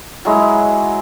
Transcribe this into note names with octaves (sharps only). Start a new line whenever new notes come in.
F#3 G#3 E4